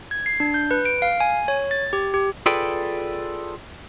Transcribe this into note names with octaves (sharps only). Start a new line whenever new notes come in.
G#6
C7
D4
G6
B4
D7
F5
G#5
C#5
A6
G4
G4
F4 G#4 A4 B4 D5 G5